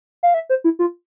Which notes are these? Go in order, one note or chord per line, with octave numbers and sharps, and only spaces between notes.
F5
E5
C5
E4
F4